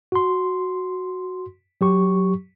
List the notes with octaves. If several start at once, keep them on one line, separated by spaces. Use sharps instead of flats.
F#4 C6
F#3 G4 C#6